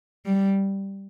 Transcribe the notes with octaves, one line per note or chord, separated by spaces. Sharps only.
G3